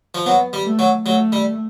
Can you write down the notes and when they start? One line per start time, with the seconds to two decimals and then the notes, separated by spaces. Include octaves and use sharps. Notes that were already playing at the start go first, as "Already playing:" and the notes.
0.15 F3
0.26 F#3 B3
0.53 G3
0.66 A3
0.79 F#3
1.06 F#3 A3
1.32 G3